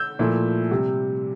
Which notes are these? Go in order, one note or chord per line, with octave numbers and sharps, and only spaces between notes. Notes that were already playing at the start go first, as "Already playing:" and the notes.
Already playing: E6 G6
A#2 F3 A3 E4
C3 G3